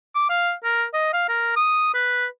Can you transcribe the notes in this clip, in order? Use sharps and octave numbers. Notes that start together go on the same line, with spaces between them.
D6
F5
A#4
D#5
F5
A#4
D#6
B4